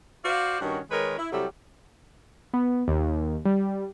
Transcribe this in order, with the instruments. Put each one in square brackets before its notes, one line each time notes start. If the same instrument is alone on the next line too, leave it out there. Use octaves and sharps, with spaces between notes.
[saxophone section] F#4 C5 D5 F5
G2 D#3 C#4 F#4
D#3 G#3 A#4 B4 C#5
E4
C3 F#3 G3 E4 G4 A4
[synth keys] B3
D#2
G3